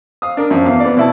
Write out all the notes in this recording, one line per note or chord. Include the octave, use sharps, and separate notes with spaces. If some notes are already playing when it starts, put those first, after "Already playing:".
F5 D#6
D4 A#4
F#2 F3
E2 F5
B3 D5
B2 E4 A5